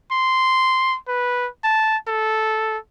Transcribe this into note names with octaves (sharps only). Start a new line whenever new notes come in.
C6
B4
A5
A4